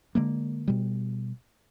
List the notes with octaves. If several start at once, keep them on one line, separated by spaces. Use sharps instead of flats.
D3 E3 G#3 A#3
B2 G3